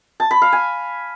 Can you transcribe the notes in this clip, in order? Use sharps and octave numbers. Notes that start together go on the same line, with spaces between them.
A5
B5
F5
G#5